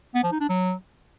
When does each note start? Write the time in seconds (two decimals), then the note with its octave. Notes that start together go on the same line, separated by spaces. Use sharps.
0.15 B3
0.23 F3
0.32 D#4
0.40 D4
0.49 F#3